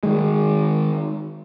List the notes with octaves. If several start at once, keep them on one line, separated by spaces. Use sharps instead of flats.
D#3 G#3